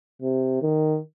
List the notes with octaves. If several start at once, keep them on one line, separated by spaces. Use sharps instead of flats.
C3
D#3